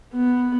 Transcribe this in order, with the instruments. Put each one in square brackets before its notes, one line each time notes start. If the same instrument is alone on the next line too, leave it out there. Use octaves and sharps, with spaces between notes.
[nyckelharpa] B3